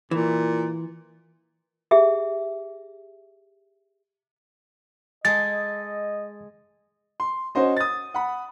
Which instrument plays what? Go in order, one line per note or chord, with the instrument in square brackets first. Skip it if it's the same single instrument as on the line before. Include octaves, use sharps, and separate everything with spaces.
[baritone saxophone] A#2 [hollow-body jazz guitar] E3
[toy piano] G4 G#4 E5
[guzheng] G#3 G#4 A4 [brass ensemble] D#5 [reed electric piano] A6
[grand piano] C6
C#4 F#4 C5 D#5
D#6 A6
F#5 B5